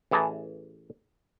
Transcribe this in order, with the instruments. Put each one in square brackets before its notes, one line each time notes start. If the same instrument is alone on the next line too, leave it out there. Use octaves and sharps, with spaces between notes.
[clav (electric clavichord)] A1 E3 G#4 A5 A#5